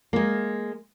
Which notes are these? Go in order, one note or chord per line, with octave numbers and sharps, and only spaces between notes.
G#3 A#3